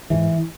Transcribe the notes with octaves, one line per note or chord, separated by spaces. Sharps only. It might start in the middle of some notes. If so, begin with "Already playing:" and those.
G#2 E3